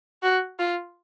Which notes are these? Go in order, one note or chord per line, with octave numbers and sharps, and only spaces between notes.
F#4
F4